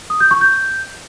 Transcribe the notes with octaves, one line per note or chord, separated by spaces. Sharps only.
D#6
G6
C#6
G6